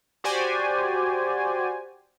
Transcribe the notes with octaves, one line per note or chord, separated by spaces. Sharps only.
F#4 G4 C5 D5 G#5